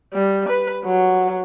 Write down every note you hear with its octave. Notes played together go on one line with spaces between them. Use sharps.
G3
B4
F#3